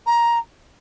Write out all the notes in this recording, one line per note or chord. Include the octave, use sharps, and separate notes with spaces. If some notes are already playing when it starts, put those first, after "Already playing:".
A#5